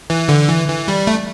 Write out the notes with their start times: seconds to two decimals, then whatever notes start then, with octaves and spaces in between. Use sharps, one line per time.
0.10 E3
0.29 D3
0.48 E3
0.68 E3
0.88 G3
1.07 A3